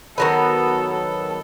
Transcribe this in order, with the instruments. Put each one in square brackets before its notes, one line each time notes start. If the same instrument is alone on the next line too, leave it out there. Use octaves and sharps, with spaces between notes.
[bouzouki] D#3 F#3 B3 [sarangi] A4
[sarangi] A4